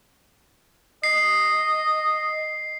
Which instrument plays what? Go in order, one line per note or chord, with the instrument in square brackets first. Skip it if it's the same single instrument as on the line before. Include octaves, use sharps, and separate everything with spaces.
[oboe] D#5 [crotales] C7